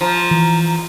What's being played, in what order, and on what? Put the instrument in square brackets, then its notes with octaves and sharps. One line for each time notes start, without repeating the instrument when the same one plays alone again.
[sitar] F3 [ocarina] A#5
[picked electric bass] E3